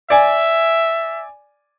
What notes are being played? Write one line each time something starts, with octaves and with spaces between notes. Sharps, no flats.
D5 E5 G#5